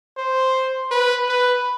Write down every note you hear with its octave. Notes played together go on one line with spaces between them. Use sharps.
C5
B4
B4